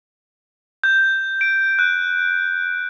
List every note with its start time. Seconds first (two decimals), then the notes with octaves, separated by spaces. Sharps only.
0.84 G6
1.41 D7
1.79 F#6